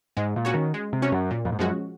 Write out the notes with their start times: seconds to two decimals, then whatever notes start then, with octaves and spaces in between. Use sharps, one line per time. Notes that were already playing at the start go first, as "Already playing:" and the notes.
0.17 G#2 G#3
0.36 A#2
0.45 C#4 F#4 C#5
0.54 D#3
0.74 G#3
0.93 C3
1.02 C#4 F#4 C#5
1.12 F#2
1.31 A#2
1.45 F2
1.52 G#2
1.59 F#2 F3 G#3 C#4 F#4